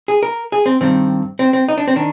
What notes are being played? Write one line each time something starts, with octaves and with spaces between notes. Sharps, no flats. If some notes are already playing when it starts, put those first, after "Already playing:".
G#4
A#4
G#4
C4
G2 D#3 C4
C4
C4
D#4
D4
C4
D#3 D4